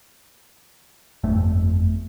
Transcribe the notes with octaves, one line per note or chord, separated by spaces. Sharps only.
G1 F2 A3